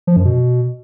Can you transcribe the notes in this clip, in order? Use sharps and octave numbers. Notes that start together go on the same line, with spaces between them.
F3
F#2
B2